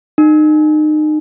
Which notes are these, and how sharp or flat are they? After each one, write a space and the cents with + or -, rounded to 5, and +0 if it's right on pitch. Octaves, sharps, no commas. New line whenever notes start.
D#4 -30